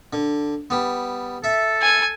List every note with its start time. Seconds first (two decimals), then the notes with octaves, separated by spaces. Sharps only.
0.13 D3
0.70 G3 B3
1.44 A4 E5
1.82 G#5